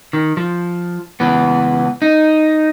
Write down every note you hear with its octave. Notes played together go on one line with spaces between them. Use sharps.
D#3
F3
C#2 E3 B3
D#4